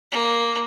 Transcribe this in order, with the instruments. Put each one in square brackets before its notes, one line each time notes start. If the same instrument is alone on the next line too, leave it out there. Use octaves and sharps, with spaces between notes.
[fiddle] A#3